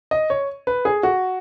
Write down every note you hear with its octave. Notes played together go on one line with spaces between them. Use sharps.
D#5
C#5
B4
G#4
F#4